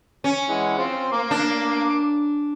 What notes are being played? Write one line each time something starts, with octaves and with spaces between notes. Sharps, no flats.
C#4
E3 G#3 F#5
C4 F4 C5
A#3 D6
D4